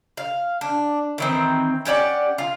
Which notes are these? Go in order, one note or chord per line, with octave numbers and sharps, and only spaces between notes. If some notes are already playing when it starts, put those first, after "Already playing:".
F5
D4
D#3 E3 C4
C#4 G4 D5 F#5
F4